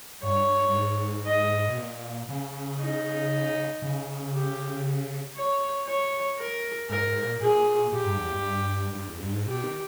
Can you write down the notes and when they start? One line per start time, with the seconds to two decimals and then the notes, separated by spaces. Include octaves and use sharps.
0.23 G2 C#5
0.69 G2
0.75 G#2
1.26 D#5
1.68 B2
1.77 A#2
2.29 C#3
2.80 D#4
3.82 C#3
4.33 G4
5.36 C#5
5.87 C#5
6.39 A#4
6.90 G#2 A#4
7.07 G#2
7.24 A#2
7.41 A#2 G#4
7.92 A#2 G4
8.05 G2
8.17 E2
8.31 G2
8.95 G2
9.08 E2
9.20 G2
9.33 G#2
9.45 B2 G4
9.63 D#3